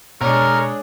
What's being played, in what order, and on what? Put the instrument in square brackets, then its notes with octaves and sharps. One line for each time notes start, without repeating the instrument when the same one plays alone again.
[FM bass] B2 [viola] G#3 D4 [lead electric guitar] A#4 [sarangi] C#5